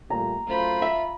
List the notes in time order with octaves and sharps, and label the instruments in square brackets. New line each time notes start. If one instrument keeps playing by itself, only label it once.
[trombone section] A#2 G3 A3 [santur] A#5
[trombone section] F#2 A3 C5 [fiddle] F4 B5
[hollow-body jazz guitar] E5